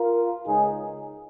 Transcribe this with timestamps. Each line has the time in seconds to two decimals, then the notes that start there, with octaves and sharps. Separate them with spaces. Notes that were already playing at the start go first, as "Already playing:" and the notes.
Already playing: F4 A#4
0.46 C#2 C#3 G#3 D#4 G#4